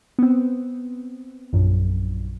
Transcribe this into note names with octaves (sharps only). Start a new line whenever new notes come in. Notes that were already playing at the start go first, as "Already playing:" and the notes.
B3 C4
A#1 F#2